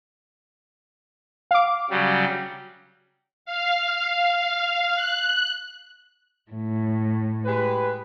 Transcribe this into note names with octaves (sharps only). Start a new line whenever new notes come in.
F5 D6
C#3 F#3 G3
F5
F#6
A2
G#3 G4 B4